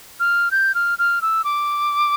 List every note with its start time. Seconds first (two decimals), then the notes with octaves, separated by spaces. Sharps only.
0.20 F6
0.51 G6
0.75 F6
0.99 F6
1.22 E6
1.44 D6